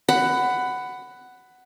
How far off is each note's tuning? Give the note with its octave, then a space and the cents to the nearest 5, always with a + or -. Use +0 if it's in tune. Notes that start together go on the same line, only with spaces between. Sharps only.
F#5 +10 B5 +15